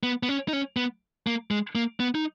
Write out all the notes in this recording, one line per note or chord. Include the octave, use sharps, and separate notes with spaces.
B3
B3
C#4
D#4
C#4
B3
A#3
G#3
A#3
B3
D#4